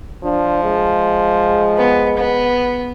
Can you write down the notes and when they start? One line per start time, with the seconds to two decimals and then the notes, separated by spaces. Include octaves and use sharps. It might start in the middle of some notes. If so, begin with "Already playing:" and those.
0.24 F3 D4
0.64 G#3
1.78 B3
2.17 B3